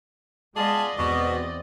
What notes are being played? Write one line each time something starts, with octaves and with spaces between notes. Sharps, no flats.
G#3 B3 F4 G#4 D5 D#5 A5
E2 B2 C4 F#4